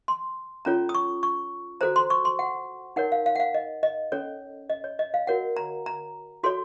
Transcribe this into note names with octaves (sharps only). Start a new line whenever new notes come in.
C6
C#4 F4 A4 C#5 A#5
D#6
C#6
C#6
F#4 A4 C5 A#5
C6
C#6
C6
F#5
D#4 A#4 C#5 F#5
F5
F5
F#5
F5
D#5
D#5
C#4 A4 C#5
D#5
C#5
D#5
F5
F#4 A#4 C#5 F#5
A#5
A#5
F#4 A4 C#5 C6